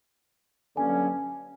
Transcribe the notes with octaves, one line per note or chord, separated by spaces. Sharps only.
G2 D3 F#3 A#3 C#4 G#5